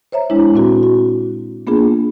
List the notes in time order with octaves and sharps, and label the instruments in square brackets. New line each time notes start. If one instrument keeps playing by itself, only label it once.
[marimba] C5 C#5 E5 A#5
G#3 D4 E4
A#2 C4 F#4
F#4
A#3 B3 D4 F4 G#4